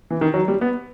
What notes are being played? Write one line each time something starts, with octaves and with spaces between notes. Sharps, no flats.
E3
D#3
F#3
G3
B3